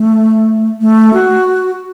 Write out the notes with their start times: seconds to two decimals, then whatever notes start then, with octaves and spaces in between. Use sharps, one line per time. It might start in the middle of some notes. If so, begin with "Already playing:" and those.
Already playing: A3
0.81 A3
1.14 F#4